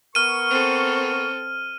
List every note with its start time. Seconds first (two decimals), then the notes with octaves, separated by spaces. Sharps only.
0.15 B3 A#4 C#6 F6 D#7
0.50 C4 A4